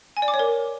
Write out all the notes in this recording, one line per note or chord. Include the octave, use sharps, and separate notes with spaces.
G#5
D5
D6
C#5
A#4